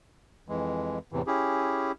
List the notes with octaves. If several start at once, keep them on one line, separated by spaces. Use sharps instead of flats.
F2 E3 G#3
E2 A2 C3 E3
C#4 E4 G4 G#4